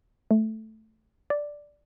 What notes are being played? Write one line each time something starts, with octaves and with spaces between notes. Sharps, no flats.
A3
D5